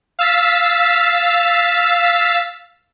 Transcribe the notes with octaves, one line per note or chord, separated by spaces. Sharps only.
F5 E6 A6 B6